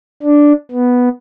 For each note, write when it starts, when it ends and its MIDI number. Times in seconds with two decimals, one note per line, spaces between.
0.23 0.53 62
0.72 1.09 59